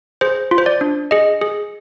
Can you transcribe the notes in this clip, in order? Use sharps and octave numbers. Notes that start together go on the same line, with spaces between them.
G#4 C5
F4
C5
D5
D4
G#4 D#5
G#4